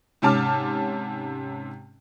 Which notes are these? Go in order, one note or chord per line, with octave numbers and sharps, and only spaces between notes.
G#2 C3 C#4 A5 D6 F6